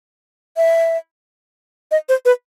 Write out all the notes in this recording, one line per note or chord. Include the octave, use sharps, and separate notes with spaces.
E5
D#5
C5
B4